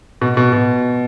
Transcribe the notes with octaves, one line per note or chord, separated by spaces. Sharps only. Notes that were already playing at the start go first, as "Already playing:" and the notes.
B2
B2
B2